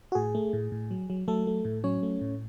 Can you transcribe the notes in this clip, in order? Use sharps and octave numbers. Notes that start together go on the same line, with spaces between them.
F#4
A2 G#4
A3
A2
A2
F#3
F#3
F#3 A3 A4
A3
A2
F#3 C#4 C#5
A3
A2